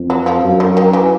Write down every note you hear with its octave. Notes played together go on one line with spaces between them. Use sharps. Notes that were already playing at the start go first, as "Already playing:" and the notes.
Already playing: F2
F#3
F3
F#2
D#3
D#3
E3